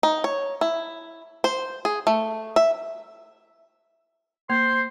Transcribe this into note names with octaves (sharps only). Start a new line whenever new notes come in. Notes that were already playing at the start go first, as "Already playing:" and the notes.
D#4
C#5
E4
C5
G#4
A3
E5
A#3 C5 C6